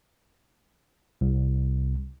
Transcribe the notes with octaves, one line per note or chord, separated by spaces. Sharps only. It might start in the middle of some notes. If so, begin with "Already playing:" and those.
C2